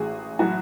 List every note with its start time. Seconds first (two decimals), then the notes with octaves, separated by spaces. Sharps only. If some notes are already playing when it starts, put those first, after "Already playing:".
Already playing: A1 F#4 G#4
0.39 A2 F#3 F#4